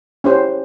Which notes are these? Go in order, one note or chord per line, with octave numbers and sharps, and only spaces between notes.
C#4 E4 G4 C5